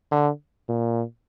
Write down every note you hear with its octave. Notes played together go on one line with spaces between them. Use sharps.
D3
A#2